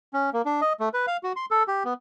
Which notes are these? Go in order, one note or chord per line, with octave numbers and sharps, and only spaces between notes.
C#4
A#3
D4
D#5
A3
B4
F5
F#4
C6
A4
G4
B3